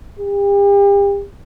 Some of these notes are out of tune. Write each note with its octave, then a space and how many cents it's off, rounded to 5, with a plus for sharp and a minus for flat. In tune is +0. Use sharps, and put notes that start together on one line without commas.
G4 +40